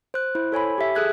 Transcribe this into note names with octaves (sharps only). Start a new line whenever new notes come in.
C5 F#6
E4 C5
A4 C#5 G#5 B5
G4 E5
G#4 A4 F#6 G#6